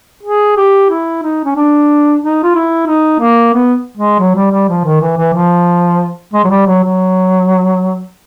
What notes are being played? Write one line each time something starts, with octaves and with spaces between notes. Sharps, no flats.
G#4
G4
E4
D#4
C#4
D4
D#4
F4
E4
D#4
A#3
B3
G#3
F#3
G3
G3
F3
D#3
E3
E3
F3
G#3
F#3
G3
F#3
F#3